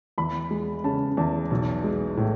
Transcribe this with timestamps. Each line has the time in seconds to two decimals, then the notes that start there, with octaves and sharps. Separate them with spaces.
0.18 E2 B5
0.51 G#3
0.84 C#3 A5
1.17 E2 A5
1.51 B1
1.84 G#3
2.17 A2